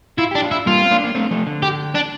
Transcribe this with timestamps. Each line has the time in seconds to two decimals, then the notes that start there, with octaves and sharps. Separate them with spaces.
0.18 E4 F4
0.31 D4 G4
0.42 D4 F4
0.51 E4
0.66 G3 A#3 F4
0.85 C4
0.91 A#3 D4
1.04 A#3
1.15 A3 C4
1.31 F3 A3
1.47 D3
1.62 G4
1.95 D4